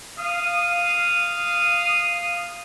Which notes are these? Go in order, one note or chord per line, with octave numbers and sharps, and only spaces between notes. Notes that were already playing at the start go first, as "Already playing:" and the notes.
F5 D#6